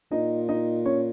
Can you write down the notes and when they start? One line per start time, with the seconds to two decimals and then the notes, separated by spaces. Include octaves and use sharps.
0.11 A#2 D#4 D#5
0.49 D#4 D#5
0.85 C#4 C#5